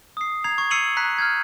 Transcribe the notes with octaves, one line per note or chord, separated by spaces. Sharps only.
D#6 C7
A#5 G#6 C7 F7
C#6 G#6
E6 C7 C#7 D#7 F7 F#7
A#5 F#6 B6
F6 G6 G#6